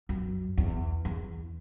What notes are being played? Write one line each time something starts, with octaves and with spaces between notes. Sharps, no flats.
F#2
E2
E2